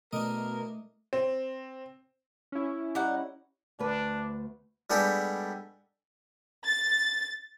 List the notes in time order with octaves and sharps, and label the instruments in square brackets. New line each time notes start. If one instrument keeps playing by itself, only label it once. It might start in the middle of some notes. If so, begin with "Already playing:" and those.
[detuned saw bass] B2 [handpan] A3 [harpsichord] D4 D#5 [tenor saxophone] A#4
[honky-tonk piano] C4
[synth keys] C#4 E4
[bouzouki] G3 D#4 F#5
[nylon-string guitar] D2 A3 B4 [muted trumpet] D4
[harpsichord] G3 G#3 B3 D4 G4 A4
[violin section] A6